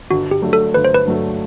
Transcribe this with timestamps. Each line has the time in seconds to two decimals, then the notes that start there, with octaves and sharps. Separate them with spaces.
0.10 G1 F#4
0.31 G4
0.42 G2 F#3 A3
0.53 A4
0.74 G1 B4
0.85 C5
0.95 B4
1.05 G2 F#3 A3